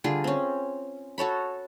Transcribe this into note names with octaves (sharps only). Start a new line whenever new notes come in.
D3 G3 F4 G#4
C4 C#4
F#4 A4 C#5 B5